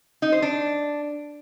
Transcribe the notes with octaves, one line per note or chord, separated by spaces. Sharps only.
D#4
C5
D4